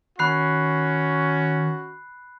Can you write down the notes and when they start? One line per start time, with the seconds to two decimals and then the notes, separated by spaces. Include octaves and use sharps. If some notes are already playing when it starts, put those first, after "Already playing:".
0.19 D#3 C#4 F#4 B5 F#6 C7